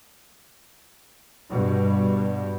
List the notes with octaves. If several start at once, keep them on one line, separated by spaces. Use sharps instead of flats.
G2 B2 G3